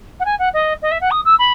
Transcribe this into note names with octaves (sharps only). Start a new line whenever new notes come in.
F#5
G#5
F#5
D#5
D#5
E5
F#5
D#6
E6
B5